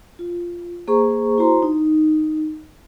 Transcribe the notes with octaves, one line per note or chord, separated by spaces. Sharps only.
F4
A#3 G#4 C5 A#5 C#6
E4 F#4 C5 A#5 C6
D#4